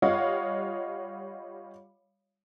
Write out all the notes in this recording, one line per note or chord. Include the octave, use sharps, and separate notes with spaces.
G3 F4 C#5 D#5 F5 F#5